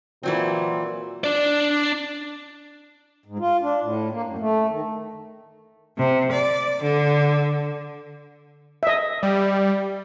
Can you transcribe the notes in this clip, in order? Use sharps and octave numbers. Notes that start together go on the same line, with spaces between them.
A#2 E3 F#3 C4
D4 D5
G#2
F4
D4
A2
A#3
F#2
A3
D#3
C3
D5
D3
D#5 E5
G3